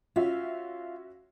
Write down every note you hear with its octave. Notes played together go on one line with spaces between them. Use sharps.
C#4 F4 F#4 E5